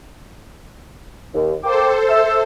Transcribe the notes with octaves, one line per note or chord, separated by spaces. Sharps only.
D#2
A#3 A4 C5 G5 D6
E5 A5 E6